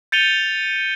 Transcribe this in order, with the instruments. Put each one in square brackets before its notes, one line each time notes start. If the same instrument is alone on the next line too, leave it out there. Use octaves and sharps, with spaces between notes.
[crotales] G6 A6 C#7 D#7 F7 G7